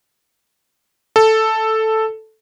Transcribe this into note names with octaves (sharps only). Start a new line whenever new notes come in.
A4